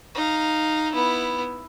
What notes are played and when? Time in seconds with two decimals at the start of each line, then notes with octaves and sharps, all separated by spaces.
0.15 D#4 F5
0.92 B3 E4